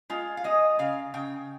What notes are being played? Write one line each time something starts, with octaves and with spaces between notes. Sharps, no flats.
G#3 F4
F5
G#3 D#5
C#3 F5
C#3 G5